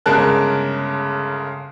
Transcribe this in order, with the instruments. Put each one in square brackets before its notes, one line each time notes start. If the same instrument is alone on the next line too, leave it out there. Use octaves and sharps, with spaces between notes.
[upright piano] G1 C#3 G#3 A#4 A5 F#6